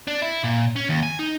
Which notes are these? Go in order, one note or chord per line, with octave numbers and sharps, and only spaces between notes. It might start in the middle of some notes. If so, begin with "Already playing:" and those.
D4
E4
A#2
C#4
D#2
G#5
D#4